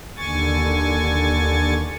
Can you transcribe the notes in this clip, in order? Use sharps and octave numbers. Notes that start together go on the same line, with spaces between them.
D#2 D3 G#5 C#6 A6